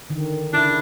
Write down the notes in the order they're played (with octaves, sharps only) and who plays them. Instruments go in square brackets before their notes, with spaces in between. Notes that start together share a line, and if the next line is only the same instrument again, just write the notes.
[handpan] D3 D#3
[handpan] C#3 E4 [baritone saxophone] D4